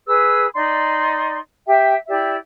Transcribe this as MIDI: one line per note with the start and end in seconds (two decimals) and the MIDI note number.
0.07 0.45 68
0.07 0.45 71
0.07 0.45 88
0.53 1.37 63
0.53 1.37 74
0.53 1.37 84
1.67 1.94 67
1.67 1.94 76
1.67 1.94 79
2.08 2.35 64
2.08 2.35 67
2.08 2.35 74
2.08 2.35 76